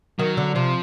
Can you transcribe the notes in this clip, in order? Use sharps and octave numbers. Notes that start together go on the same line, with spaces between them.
D#3 F#3
D3
C3 F3